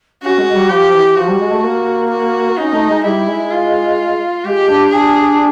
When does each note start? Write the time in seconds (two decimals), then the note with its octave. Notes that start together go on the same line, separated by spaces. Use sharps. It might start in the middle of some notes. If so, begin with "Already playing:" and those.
0.22 C#4 F#4
0.38 G#3
0.53 G3
0.70 F3 G4
0.92 E3
1.16 F3 F#4
1.28 G3
1.39 G#3
1.51 A3
1.63 A#3
2.10 F#4
2.57 C#4 D#4
2.72 A3
2.89 G#3
3.04 G3 E4
3.27 G#3
3.51 F4
4.44 G#3 G4
4.68 D4
4.91 D4 G#4